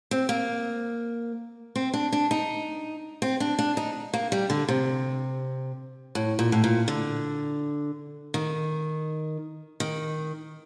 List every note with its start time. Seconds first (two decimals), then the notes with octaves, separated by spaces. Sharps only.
0.11 C4
0.29 A#3
1.76 C4
1.94 D4
2.12 D4
2.31 D#4
3.22 C4
3.40 D4
3.59 D4
3.77 D#4
4.13 A#3
4.32 G3
4.50 D3
4.68 C3
6.15 A2
6.39 A#2
6.52 A2
6.64 A#2
6.88 D3
8.34 D#3
9.80 D#3